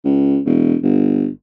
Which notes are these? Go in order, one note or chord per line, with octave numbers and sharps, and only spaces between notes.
C#2
E1
G1